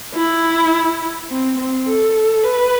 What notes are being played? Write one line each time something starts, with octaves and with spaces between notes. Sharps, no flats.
E4
C4
C4
A4
B4